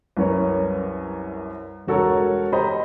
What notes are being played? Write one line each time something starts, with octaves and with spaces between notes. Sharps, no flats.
C2 F#2 C#4 A#4 B4 C#5
E1 F#4 A4 A#4 C#5
G4 C5 D#5 A#5 B5